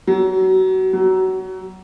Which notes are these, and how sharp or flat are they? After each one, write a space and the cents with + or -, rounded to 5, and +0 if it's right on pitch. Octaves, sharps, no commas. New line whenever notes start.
F#3 +25
F#3 +20